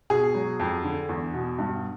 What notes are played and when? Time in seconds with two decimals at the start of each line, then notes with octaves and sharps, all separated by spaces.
0.10 B2 G#4
0.35 F#3
0.60 F2
0.84 D3
1.09 E2
1.34 B2
1.58 G2